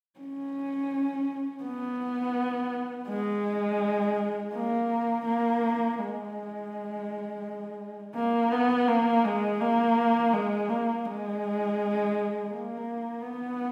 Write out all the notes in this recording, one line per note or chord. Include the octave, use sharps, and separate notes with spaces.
C#4
B3
G#3
A#3
A#3
G#3
A#3
B3
A#3
G#3
A#3
G#3
A#3
G#3
A#3
B3